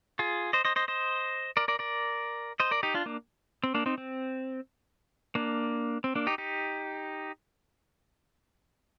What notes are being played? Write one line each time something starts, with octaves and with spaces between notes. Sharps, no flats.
F4 G#4
C5 D#5
C5 D#5
C5 D#5
C5 D#5
A#4 D5
A#4 D5
A#4 D5
C5 D#5
A#4 D5
D#4 G4
D4 F4
A#3 D4
C4
A#3 D4
C4 D#4
C4
A#3 D4
C4
A#3 D4
D#4 G4
D#4 G4